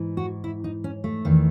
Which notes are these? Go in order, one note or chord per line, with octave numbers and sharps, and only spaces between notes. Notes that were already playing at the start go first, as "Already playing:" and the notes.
Already playing: G#2 E3
F#4
E4
D#4
C#4
A3
E2 D#3